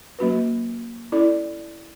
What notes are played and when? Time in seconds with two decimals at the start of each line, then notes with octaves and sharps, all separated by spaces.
0.19 F#3 A#3 C#4 F#4 B4
1.12 C#4 E4 A4 D5